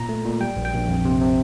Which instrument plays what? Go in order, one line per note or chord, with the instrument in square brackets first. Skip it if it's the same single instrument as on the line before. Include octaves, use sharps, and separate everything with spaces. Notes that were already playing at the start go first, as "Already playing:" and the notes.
Already playing: [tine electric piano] A#2 A#5
A3
A#2
G3 G5
A#1
G5
A#1
F2
C3
C3